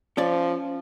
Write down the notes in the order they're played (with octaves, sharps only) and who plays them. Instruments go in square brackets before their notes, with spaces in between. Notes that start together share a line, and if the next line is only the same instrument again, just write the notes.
[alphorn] F3 [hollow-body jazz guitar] C#4 D5